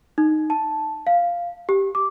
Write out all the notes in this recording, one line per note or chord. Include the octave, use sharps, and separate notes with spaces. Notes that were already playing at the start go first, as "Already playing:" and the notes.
D#4
A5
F5
G4
D6